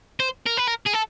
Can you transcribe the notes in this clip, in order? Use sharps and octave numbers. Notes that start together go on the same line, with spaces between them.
C5
A#4
B4
A#4
G#4
A4